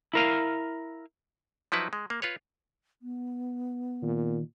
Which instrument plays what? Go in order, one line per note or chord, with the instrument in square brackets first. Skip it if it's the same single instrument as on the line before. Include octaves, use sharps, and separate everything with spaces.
[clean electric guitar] E4 A#4 F5
[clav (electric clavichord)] F3 F#3 D#4 E4 B4
G#3
A#3
F4 B4 C#5
[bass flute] B3
[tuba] A#2 [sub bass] D#3